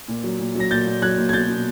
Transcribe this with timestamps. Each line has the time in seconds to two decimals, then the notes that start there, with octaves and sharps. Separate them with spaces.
0.08 A#2
0.24 F#3
0.39 A#2
0.55 F#3 A#6
0.71 A#2 G6 A6
0.86 A#2
1.02 F#3 F#6 G#6
1.18 A#2
1.29 G#6
1.33 B2 G6 A6
1.49 B2